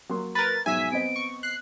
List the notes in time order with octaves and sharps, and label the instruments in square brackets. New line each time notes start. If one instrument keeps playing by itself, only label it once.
[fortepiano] F#3 A#3 C6
[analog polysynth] A#4 B4 [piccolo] A6
[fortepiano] G#2 B2 F#3 [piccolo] E5 [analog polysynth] G#5 B6
[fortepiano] B3 C4 D#5 [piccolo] D7
[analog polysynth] C#6
[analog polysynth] F#6 [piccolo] C7